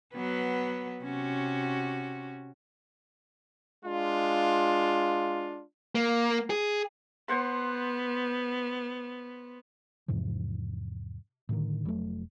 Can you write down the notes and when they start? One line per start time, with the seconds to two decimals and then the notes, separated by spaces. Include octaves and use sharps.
0.14 F#3 B3 B4
1.02 C3 C#4 F#4
3.85 G#3 D4 F4
5.95 A#3
6.50 G#4
7.28 B3 C5 F#5 C6
10.08 E2 G#2 C3 F3
11.49 A2 D3 D#3
11.85 F1 F#3 A3